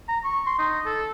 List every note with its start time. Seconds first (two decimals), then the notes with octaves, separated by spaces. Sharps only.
0.08 A#5
0.24 C#6
0.47 C6
0.59 D#4
0.86 A4